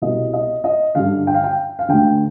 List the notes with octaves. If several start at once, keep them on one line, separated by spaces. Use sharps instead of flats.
C2 B2 D#5
D#5
D#5
G2 D3 F5
G5
F5
G5
F5
D2 D3 G5